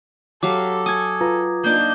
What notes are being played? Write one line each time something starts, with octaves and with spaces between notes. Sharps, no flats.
F#3 G4 A4 F5 D6
G#5 C#6 D#6 G#6
F4 B4 A#5
A#3 D4 D#4 G6